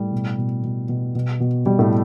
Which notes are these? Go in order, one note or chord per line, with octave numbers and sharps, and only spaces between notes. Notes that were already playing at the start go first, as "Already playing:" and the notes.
Already playing: A2 G3
B2
B2
B2
B2
B2
B2
B2 G3
A2 A3